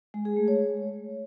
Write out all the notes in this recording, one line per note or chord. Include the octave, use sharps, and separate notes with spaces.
G#3
G#4
A3
C#5